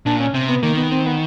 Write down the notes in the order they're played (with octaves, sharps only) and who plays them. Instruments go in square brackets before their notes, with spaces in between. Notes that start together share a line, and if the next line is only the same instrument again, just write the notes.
[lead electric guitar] A#2 [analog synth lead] D4
[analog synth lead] C#4
[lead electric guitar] C3 [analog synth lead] C4
[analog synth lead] B3
[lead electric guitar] D#3 [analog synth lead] A#3
[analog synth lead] B3
C4
B3